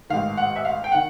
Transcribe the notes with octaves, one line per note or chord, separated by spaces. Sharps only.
A1 G#2 D#3 F5
F#5
E5
F5
G5
D#3 F#5